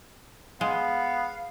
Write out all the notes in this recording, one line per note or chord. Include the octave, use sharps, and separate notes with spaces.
G#3 B3 F5